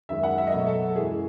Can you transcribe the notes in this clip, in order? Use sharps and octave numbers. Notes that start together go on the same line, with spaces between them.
F#2 D#3 G#3 E5
F#5
E5
D#5
B2 F#3 A3 E5
A4
F#2 E3 G#3 G#4